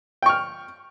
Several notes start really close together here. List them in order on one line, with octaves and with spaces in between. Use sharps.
G5 C#6 F6